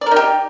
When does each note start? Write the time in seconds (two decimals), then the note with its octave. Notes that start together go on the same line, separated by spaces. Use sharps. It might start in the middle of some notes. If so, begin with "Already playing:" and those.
0.01 D5
0.06 A#4
0.11 D#4
0.16 G4